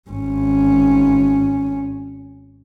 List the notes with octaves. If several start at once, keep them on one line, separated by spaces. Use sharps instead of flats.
G#1 C#4